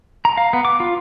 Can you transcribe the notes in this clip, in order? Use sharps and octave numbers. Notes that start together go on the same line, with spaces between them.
A#5
F5
B3
D6
F4